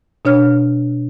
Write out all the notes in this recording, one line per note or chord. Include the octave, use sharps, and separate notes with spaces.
B2 D4 C#5 F6